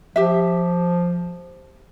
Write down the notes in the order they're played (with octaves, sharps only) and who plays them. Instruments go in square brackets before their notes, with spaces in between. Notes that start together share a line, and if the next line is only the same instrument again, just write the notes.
[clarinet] F3 [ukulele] G4 E5